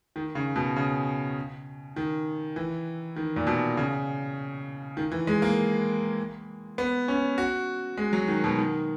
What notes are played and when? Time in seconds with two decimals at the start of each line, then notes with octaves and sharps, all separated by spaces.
0.16 D#3
0.35 C#3
0.56 B2
0.76 C#3
1.96 D#3
2.56 E3
3.16 D#3
3.36 A#2
3.47 B2
3.77 C#3
4.97 D#3
5.12 E3
5.27 G#3
5.42 A#3
6.78 B3
7.08 C#4
7.38 F#4
7.97 G#3
8.13 F#3
8.28 D#3
8.44 B2
8.58 D#3